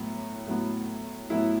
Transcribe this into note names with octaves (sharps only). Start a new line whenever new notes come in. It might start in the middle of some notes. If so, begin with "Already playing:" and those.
Already playing: A2 F#3 B3
A2 F#3 B3
A2 F#3 B3 E4